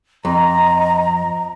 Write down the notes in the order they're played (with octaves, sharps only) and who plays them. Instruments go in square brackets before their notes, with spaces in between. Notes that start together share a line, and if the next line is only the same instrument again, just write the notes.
[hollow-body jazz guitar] F2 [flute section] D#5 A#5